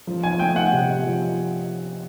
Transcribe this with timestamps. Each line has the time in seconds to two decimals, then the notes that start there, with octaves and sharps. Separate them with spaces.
0.07 F3
0.23 G#5
0.40 A3 G5
0.56 F#5
0.72 C3
1.05 F3